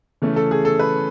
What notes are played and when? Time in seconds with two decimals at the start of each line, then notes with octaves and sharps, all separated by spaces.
0.22 C#3 E3 A3 C#4
0.36 A4
0.51 G#4
0.65 A4
0.79 B4